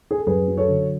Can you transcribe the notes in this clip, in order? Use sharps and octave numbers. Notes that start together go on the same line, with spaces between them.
G#4
A4
F#2 G#4 B4
F#3
A4 C#5
D3